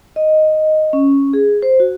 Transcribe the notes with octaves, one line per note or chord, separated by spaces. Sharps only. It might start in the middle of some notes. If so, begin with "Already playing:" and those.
D#5
C#4
G#4
C5
F#4